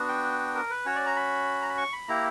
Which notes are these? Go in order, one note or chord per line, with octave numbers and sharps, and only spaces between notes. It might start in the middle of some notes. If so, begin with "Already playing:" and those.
Already playing: B3 D4 F#4
G5
A#4
B4
C#4 F#4 C#5
D5
A#5
B5
A#5
B5
C#6
B5
A#3 E4 G4 A#5